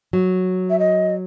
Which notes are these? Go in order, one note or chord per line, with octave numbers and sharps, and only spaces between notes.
F#3
E5
D#5